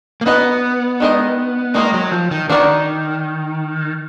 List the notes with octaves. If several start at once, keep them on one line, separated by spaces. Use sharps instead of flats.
A#3
B3 D#4 F#4 B4 D#5
D#3 G#3 D#4 A#4 D#5
D#3 G#3 A#3 D#4 A#4 D#5
F#3
F3
D#3
D#3 D4 F#4 A#4 D5